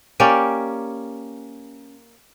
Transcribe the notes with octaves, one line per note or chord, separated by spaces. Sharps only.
A#3 C#4 G4 D5